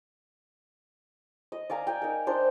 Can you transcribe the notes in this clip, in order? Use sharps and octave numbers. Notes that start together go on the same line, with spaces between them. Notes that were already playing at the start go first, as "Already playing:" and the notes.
D#5
D5 F5 G#5 A#5
G5 G#5
D#4 A#4
D4 C5 D#5